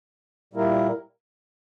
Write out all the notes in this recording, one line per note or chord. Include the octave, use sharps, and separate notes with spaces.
A#2 G3 A#3 E4 A#4